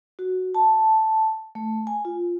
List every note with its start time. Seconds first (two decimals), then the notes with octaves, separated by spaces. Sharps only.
0.19 F#4
0.55 A5
1.55 A3
1.87 G#5
2.05 F4